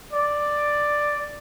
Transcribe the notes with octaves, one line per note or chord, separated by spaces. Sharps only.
D5